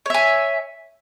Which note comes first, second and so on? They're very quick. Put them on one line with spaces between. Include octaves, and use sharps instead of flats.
C#5 E5 G#5